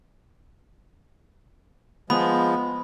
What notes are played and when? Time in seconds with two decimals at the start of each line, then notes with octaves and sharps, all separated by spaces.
2.10 F3 G#3 B3 B5